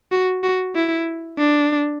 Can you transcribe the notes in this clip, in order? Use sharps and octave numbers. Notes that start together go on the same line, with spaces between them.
F#4
F#4
E4
D4